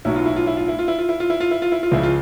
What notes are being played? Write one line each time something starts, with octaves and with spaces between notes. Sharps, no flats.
B1 A2 F#3 E4
F4
E4
F4
E4
F4
E4
F4
E4
F4
E4
F4
E4
F4
E4
F4
E4
F4
C#2 C#3 F3 E4
F4